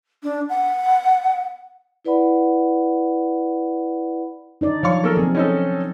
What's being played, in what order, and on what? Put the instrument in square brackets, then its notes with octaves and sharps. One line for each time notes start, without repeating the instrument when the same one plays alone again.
[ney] D4
F#5
[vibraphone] E4 B4 D5 F#5 B5
[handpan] D4 D#4 D5
[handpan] F3 F#3 [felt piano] C#5 F5 C#6
[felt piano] A#3 A4 A#4
[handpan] F3 C4 [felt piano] G#4
[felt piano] C#4 D#4 A4